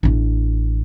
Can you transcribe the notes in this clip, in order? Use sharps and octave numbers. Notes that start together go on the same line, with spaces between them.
A1 D4